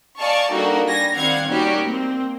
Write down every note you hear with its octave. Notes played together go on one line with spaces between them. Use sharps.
D5 D#5 F5 G#5 A5 C#6
G3 A#3 D4 D#4 F#4 A4
G3 G#5 A#6
D#3 G3 C4 F5 F#5 G#6
G3 A#3 C#4 D#4 F#4 G4
A#3 C4